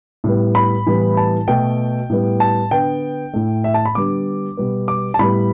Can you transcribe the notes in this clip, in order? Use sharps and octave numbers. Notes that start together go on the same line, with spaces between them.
A2 G3 B3
B5
A2 E3 G3 B3
A5
B2 A3 G5
A2 G3 B3
A5
D3 B3 G5
A2 A3
E5
A5
B5
D3 G3 B3 D6
B2 G3 B3
D6
A5
A2 G3 B3 B5